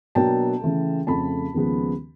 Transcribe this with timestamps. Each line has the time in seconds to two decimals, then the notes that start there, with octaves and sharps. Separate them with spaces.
0.15 B2 F#3 A#3 D4 G5 A5
0.61 C#3 E3 A3
1.07 F2 C#3 F3 A3 A5 B5
1.54 D#2 C#3 F3 G#3 B3